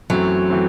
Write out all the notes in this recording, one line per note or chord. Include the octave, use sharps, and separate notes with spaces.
F#2 E3 F#3 A3 C4
E3 A3 C4